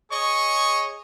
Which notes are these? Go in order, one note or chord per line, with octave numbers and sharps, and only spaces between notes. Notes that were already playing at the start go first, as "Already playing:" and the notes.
G#4 C#5 D#5 C#6